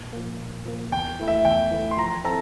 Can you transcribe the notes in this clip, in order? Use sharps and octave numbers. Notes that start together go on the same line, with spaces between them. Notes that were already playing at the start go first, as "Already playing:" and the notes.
Already playing: A#2
F3 A#3
A#2
F3 A#3
E2 G5
E3 A3 E4
E5
E2 G5
E3 A3 E4
C6
F3 A#5
C4 E4 A4 A#5